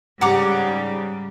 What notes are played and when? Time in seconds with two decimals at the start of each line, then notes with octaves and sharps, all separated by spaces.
0.21 G#2 C#3 G3 F#5 A#5 D6